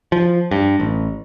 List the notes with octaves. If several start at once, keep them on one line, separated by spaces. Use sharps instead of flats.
F3
G2
A1